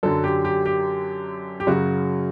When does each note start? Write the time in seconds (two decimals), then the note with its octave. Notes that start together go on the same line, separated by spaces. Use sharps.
0.03 F#2 D3 F#3 A4
0.24 G4
0.45 G4
0.66 G4
1.60 G4
1.67 F#2 C#3 F#3 F#4